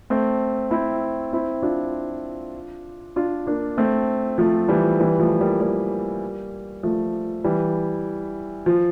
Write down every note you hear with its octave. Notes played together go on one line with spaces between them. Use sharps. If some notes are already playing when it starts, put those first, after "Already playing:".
A3 C4
C4 E4
C4 E4
D4 F4
D4 F4
A#3 D4
A3 C4
F3 A3
E3 G3
E3 G3
F3 A3
G3 A#3
G3 A#3
F3 A3
E3 G3
F3